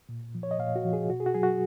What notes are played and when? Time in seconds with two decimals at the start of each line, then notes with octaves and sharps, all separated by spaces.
0.09 A#2
0.35 F3
0.43 C#5
0.51 D#5
0.59 A#2 F5
0.76 F#4
0.84 F3
0.93 G#4
1.09 B2 F#4
1.20 G#4
1.26 F#4
1.34 F#3 G#4
1.43 F#4